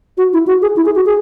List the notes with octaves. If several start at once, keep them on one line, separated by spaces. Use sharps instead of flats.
F#4
E4
F#4
G#4
E4
G#4
F#4
G#4